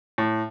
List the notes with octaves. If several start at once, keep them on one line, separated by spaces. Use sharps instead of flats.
A2